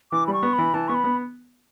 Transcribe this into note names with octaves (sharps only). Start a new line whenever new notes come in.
E3 D6
G3 B5
C#6
B3
B5
E3
E3 A5
B3 C#6
B5
B3